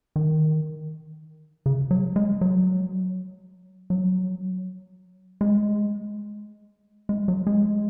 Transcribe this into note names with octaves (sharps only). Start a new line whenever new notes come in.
D#3
C#3
F#3
G#3
F#3
F#3
G#3
G#3
F#3
G#3